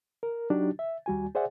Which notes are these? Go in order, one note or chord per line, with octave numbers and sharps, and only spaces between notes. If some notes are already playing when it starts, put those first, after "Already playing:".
A#4
F#3 D4 D#4 F#4 G4
E5
D#2 G3 F#4 G#5
G#4 C5 D5 E5 F#5 G#5